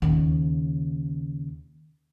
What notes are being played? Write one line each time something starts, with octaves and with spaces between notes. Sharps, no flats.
D#2 C#3